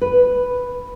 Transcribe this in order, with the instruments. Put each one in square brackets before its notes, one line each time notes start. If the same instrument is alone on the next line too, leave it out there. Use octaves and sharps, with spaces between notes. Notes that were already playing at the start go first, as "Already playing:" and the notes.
[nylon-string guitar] B4